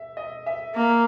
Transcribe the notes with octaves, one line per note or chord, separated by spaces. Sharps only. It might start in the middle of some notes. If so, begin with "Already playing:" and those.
Already playing: E5
D#5
E5
A#3